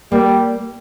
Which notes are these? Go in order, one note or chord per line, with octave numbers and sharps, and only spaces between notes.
G3 A#3